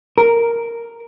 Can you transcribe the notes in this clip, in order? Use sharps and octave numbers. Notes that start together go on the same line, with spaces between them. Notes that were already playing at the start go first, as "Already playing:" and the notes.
A#4